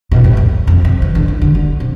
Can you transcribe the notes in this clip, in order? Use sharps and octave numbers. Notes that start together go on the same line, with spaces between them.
B2
A2
F2
F2
C3
E3
D3
E3
D3
D3
C3